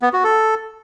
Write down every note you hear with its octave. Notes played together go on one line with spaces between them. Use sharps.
B3
F#4
A4